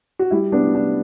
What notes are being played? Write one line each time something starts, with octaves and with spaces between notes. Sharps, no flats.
F#4
G3 E4
B3 D4
D4